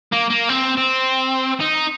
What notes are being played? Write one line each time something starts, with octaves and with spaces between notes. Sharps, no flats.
A#3
A#3
C4
C4
D#4